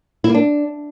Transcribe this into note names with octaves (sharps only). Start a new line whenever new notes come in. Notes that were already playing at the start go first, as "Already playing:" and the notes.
E4
A#3
D4